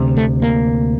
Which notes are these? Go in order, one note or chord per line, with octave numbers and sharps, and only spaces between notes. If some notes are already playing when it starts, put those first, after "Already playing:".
Already playing: D2 C3
A3
A#3